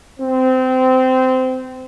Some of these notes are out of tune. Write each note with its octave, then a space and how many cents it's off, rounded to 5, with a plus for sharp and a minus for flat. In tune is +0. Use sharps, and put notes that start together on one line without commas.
C4 -20